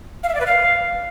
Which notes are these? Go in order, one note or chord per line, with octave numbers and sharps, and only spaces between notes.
F5
E5
D5
B4
F5